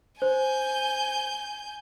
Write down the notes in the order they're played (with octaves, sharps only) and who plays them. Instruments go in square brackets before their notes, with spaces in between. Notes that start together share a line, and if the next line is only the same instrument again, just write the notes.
[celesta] C5 [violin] G#5 G6